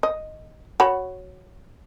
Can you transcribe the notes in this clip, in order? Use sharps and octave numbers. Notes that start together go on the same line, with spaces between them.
D#5
F#4 C#5 B5